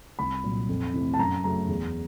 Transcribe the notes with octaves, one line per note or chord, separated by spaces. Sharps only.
C2 B5
A#2 F#3
F2
C3 E3 A3
A5
F#2 A#5
C#3 F#3 A3 A#5
E2